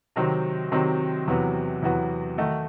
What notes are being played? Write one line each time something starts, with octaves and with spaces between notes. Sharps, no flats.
C3 D#3 F#3 C4
C3 D#3 F#3 C4
E2 C3 F#3 B3 F#4
E2 C3 F#3 B3 F#4
D#3 A3 D#4 F#4